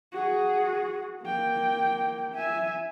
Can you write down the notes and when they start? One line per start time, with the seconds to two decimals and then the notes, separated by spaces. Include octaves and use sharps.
0.13 F#4 G#4
1.23 A#3 G5
2.34 E5 G#5